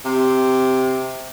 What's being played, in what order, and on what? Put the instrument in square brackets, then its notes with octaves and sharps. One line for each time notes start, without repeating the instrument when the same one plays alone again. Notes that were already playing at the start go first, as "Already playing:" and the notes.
[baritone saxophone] C3